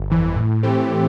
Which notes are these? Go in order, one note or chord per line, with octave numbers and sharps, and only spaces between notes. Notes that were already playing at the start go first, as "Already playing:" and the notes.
Already playing: G1
F2 E3
A2
E3 A3 C4 G4